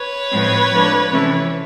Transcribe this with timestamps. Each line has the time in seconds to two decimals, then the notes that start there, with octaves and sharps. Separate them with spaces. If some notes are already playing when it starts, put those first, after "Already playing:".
Already playing: B4 C#5
0.31 A2 F3 G#3 C4
0.71 F3 A3 D4
1.11 C3 E3 A3 C#4 E4